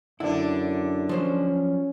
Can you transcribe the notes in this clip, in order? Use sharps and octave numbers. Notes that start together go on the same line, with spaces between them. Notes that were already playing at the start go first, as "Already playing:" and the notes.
F#2 D3 D4 E4
F3 F#3 C#4 C5